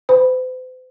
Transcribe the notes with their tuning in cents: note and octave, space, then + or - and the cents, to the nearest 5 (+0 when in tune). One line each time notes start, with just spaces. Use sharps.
C5 -45 B5 +0